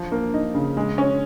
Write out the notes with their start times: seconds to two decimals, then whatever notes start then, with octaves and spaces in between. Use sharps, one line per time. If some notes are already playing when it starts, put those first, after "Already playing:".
Already playing: F3
0.12 A#3
0.34 D#4
0.55 C#3
0.77 G#3
0.98 C#4